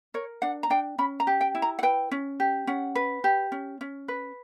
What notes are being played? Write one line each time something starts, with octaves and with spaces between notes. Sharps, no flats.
A#4 C#5
D4 F#5
A#5
D4 G5
C#4 B5
A#5
G4
G5
E4
A#5
F#5
B4 G5
C#4
G4
C#4 F#5
B4
G4
C#4
C#4
B4